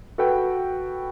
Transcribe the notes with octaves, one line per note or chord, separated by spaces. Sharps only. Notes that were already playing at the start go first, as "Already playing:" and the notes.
F#4 A4 B4 G5